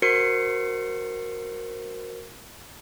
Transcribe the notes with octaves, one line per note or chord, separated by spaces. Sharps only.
F#4 A#4 C5 C7 C#7